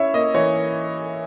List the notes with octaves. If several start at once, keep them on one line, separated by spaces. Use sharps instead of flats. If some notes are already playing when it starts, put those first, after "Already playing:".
Already playing: C#4 E4 C#5 E5
A#3 D#5
E3 C#5